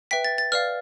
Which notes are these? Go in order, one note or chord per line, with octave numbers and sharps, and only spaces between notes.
B4 E5 G5 B6
A6
A6
B4 D5 F5 F6